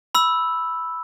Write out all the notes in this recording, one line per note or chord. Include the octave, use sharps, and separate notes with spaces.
B5 E6